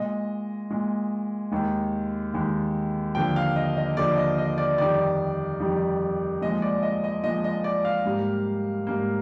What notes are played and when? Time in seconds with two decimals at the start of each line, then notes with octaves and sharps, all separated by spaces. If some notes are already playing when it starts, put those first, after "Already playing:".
Already playing: A#2 G#3 D#5
0.70 A#2 G#3
1.52 D#2 D#3 G#3
2.34 D#2 D#3 G#3
3.15 D#2 D3 F3 G5
3.36 F5
3.56 D#5
3.77 D#5
3.97 D#2 D3 F3 D5
4.17 D#5
4.38 D#5
4.58 D5
4.78 F2 D#3 G3 D5
5.60 F2 D#3 G3
6.42 A#2 F3 G#3 D#5
6.62 D5
6.83 D#5
7.04 D#5
7.24 A#2 F3 G#3 D#5
7.44 D#5
7.64 D5
7.85 F5
8.06 G#2 G3 A#3
8.87 G#2 G3 A#3